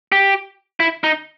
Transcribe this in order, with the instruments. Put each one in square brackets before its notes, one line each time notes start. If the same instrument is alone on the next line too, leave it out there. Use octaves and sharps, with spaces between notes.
[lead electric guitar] G4
E4
D#4